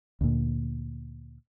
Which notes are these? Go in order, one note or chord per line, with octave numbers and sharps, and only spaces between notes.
D2 A#2